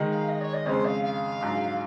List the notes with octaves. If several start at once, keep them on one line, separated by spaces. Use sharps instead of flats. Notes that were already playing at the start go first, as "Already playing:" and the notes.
Already playing: D#3 G#3 D#4
F5
D#5
C#5
D#5
F2 C#3 G#3 C#4 C5
F5
F5
A#1 G#2 F#3